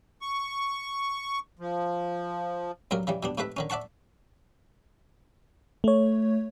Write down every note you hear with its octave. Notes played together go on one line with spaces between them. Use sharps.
C#6
F3
C#2 G2 F#3 A#4
C#3 E3 G3
B2 G3 D4
G#2 C3 A3 B4 E5
D3 D#3 C#4
D5 E5 F#5 A5 C#6
A3 C#5